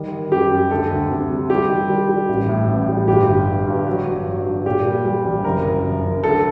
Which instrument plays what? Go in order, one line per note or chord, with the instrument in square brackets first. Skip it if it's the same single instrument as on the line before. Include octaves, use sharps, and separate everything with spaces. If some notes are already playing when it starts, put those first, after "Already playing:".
Already playing: [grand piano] D#3 G3
D#3
F#2 G4
F#2
D2 A4
D2
C3
G3
G3 G4
D#3
G3
G3
A1
A2
A1
G3
G1 G4
G1
G1
G2
F#3
G1
F#3
G2
A#2 G4
G3
G3
A#1
F#1 A#4
F#2
F#1
F#1
D2 A4